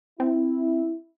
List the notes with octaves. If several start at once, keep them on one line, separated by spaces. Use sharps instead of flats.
C4 E4